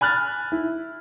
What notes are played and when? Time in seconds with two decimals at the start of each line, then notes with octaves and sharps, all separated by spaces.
0.01 G#5 B5 F6 F#6 A6
0.52 E4